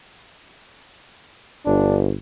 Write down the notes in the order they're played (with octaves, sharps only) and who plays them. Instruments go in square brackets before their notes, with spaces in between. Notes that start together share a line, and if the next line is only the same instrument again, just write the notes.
[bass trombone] G1 [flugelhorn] D4